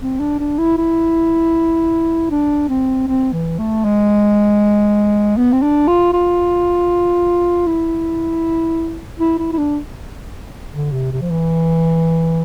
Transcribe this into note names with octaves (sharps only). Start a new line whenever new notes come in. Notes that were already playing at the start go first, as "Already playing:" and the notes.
C4
D4
D4
E4
E4
D4
C4
C4
E3
A3
G#3
B3
C4
D4
F4
F4
E4
E4
E4
E4
D4
D3
C3
C3
F3
E3